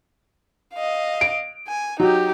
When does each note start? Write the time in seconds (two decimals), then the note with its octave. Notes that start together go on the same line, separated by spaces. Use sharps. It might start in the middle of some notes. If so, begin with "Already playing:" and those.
0.74 D#5 F5
1.21 D7
1.68 G#5
2.00 F#3 D#4 G4